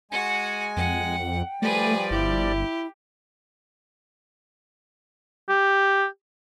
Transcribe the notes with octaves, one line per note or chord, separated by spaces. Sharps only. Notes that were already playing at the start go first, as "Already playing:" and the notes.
G#3 F#4 F#5 G#5
F2 F#5 G5
F3 G3 A3 G#4 B4 D5
G1 E4 G4
G4